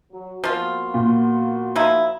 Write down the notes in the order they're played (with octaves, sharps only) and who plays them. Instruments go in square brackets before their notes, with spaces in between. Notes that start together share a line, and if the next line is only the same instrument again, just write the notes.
[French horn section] F#3
[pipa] F3 F4 [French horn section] A#3 B3 F#4
[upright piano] A#2
[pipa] F3 D#4 E4